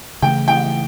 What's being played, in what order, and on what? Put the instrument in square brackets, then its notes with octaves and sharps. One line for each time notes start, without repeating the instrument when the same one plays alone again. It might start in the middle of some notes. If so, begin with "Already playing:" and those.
[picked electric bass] C#3 E3 A3 [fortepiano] G5
[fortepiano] G5